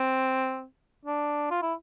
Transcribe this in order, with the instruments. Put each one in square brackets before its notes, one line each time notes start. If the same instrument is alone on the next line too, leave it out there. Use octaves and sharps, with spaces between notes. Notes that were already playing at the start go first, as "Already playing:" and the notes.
Already playing: [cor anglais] C4
D4
F4
E4